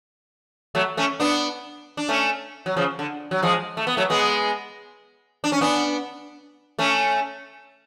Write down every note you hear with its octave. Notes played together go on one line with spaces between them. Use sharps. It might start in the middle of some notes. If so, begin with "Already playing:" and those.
F#3 A3
A3 C#4
B3 D4
D4
A3 C#4
F#3
C#3 F3
D3
F#3
F3 G#3
A3
B3
F#3 A3
G#3 B3
D4
C#4
B3 D4
A3 C#4